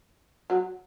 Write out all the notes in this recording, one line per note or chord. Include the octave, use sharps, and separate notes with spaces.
F#3